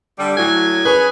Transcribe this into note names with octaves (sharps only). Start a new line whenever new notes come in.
D3 G3
A2 F#3 G#5
C#4 G#4 B4